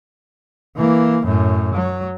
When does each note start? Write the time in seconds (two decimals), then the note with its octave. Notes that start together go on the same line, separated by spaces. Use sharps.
0.77 E3 A#3
1.24 F#2 A2
1.75 F#3